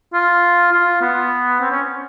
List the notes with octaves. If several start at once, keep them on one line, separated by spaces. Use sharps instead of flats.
F4
F4
B3
C4
C#4